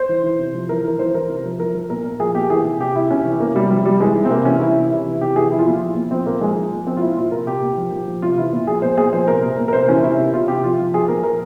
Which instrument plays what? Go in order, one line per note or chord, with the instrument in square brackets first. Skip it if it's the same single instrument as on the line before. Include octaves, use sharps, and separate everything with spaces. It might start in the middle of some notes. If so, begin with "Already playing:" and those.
Already playing: [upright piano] C5
E3
E3
C3
F3
E3 A#4
E3 A#4
E3 C5
E3 A#4
C3
F3
F3 A#4
F3 A#4
A#2 A#4
A#2
F3 G#4
A#2 G4
E3 G#4
C3
C3 G4
C3 E4
C3 C#4
E3
C3 A#3
C3 G3
F3 G3
C3 G3
E3 G#3
C3
C4
C3 A#3
E3 C#4
E3 E4
C3
C3
E3
C3 G4
E3 G#4
F3 E4
F4
A#2 E4
F3
A#2
F3 C4
F3 A#3
F3 G#3
F3
F3
F3 C4
F4
A#2 E4
A#2 F4
C3 A#4
C3 G4
A#2
F3
F3
F3
C3 F4
E3 E4
A#2
F3 G#4
A#2 C5
A#2 G#4
F3 C5
C3 A#4
A#2
A#2
A#4
C3 C5
E3 C#4
C3 E4
C3
C3 F4
C3 G4
F3 F4
F3
F3 G#4
A#2 A#4
F3 A#4